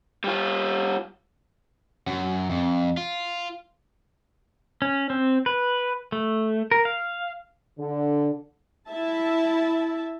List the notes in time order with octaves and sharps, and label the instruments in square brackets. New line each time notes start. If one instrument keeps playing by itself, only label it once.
[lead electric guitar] G3 F4
[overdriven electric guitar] F#2
F2
F4
[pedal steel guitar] C#4
C4
B4
A3
A#4
F5
[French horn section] D3
[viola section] E4 E5 A5